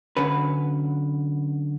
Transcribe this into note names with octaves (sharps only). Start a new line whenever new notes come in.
D3 F#3 C#4 B4